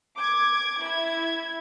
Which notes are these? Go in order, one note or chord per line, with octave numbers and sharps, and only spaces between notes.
D6 G#6
E4 G#6